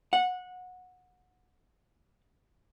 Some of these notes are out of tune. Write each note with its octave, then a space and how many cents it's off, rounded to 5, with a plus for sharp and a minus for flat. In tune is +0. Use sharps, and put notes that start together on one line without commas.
F#5 -20